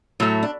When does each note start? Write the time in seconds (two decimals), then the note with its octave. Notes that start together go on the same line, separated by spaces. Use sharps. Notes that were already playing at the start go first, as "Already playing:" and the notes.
0.20 A2 F#3 A3
0.43 D4